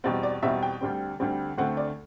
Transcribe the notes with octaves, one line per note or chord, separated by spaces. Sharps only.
E2 B2 G3 C4 F#5
D5
E2 B2 G3 C4 E5
G5
D2 D3 G3 C4
D2 D3 G3 C4
D2 D3 A3 C4 F#5
D5